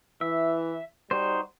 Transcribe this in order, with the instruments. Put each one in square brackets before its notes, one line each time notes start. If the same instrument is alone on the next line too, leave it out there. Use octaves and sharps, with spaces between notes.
[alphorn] E3 [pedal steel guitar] E5
[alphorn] G3 [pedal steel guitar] D#4 F#4 C5